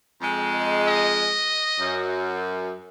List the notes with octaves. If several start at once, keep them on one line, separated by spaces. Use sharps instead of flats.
F2 G#3
D#5
F#2